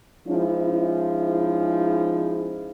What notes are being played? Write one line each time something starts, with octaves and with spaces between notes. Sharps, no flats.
F3 G#3 C#4 D#4 E4